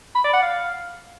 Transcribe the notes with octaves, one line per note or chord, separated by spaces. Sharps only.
B5
D5
F#5
F5